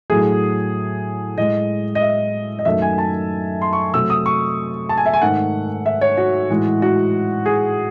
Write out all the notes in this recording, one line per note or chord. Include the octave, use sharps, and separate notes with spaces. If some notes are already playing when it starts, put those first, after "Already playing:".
A2 F#3 A3 G#4
A2 G#3 D#5
D#5
E5
D#5
F#2 D#3 F#3 A3 E5
G#5
A5
C6
C#6
C3 F#3 A3 E6
D#6
C#6
A5
G#5
E5
G#5
G#2 D#3 A3 F#5
E5
C#5
F#4
A2 E3 G#3
F#4
G#4